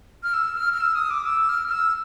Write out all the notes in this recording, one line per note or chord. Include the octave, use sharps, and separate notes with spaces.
F6
E6
F6
F6
E6
D#6
D6
E6
F6
F6
E6